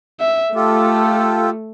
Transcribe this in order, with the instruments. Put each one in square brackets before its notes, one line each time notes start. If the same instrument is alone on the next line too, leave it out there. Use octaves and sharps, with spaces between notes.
[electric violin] E5
[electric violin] A3 [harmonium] F4 G4 A4